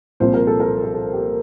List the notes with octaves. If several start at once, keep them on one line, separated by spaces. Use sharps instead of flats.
C2 A#2 F3 C5
A#4
A4
A#4
A#4
A4
G4